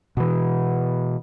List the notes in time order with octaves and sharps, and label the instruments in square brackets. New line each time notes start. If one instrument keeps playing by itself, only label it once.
[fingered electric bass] B2 E3